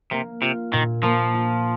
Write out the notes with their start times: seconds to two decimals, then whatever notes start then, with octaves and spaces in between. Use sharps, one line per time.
0.11 C3 A#3
0.42 C3 F4
0.73 A#2 D#3
1.03 F3 A#3
1.35 F4